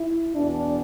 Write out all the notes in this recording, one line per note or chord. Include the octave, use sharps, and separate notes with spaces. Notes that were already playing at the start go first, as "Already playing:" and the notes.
Already playing: E4
E2 B2 D4